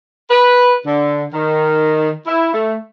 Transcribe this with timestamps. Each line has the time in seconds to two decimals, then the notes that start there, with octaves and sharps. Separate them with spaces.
0.31 B4
0.87 D3
1.34 D#3
2.27 E4
2.54 A3